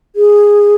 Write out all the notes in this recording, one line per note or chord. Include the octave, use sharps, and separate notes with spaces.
G#4